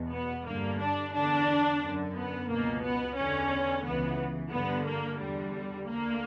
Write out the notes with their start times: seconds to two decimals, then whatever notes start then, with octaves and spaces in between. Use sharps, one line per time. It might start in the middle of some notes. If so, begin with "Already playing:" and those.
Already playing: E2 B2
0.11 B3
0.45 G2 D3 A#3
0.79 D4
1.13 E2 D3 D4
1.81 F#2 D3
2.15 B3
2.48 C#2 B2 A#3
2.83 B3
3.16 E2 D3 C#4
3.83 C#2 C#3 E3 B3
4.51 G2 D3 B3
4.85 A#3
5.19 E2 D3 G3
5.86 D2 D3 A#3